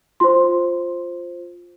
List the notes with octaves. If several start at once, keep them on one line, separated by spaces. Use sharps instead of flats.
F4 C5 C6